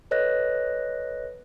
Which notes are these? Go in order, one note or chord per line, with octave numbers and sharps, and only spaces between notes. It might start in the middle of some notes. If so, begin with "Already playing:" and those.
A4 B4 C#5 D#5 F#6 A#6